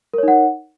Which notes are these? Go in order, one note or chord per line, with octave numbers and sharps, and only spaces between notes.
D#4 A#4 C#5 F#5